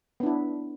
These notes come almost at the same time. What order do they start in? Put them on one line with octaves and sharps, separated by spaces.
B3 D4 E4